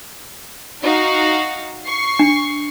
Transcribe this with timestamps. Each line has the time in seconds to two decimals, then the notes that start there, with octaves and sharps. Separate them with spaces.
0.82 D#4 F#4 F5
1.86 C#6 C7
2.19 D4